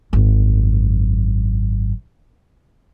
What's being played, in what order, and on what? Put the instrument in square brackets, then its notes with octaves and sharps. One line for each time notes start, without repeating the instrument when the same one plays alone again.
[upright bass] G#1 F#2